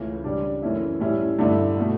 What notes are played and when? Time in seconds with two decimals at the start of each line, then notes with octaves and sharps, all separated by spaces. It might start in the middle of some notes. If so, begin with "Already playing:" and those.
Already playing: C#2 C#3 E3 A3 C#4
0.24 C#3 G3 D4
0.62 F#2 E3 A3 C#4 E4
1.00 A2 G3 C#4 E4
1.39 G2 D3 A3 E4
1.78 B2 A3